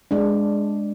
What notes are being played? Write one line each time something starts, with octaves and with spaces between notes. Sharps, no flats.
G#3 D4